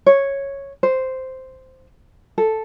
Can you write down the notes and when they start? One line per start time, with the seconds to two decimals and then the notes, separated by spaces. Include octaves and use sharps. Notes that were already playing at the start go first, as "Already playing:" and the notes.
0.06 C#5
0.83 C5
2.38 A4